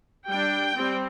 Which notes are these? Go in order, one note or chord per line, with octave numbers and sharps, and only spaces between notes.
G3 D4 G5
G3 C4